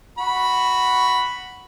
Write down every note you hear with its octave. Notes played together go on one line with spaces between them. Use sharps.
F#4 B5